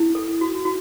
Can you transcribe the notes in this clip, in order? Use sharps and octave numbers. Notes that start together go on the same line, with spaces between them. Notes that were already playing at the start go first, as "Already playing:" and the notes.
Already playing: E4
A4
F#4
F#4